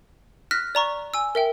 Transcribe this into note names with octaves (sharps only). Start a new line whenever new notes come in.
F6 F#6 A#6 B6
D5 A#5 C#6
G#5 E6
A#4 E5 G5